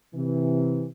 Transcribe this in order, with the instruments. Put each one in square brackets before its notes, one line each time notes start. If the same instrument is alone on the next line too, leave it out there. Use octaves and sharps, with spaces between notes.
[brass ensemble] C3 E3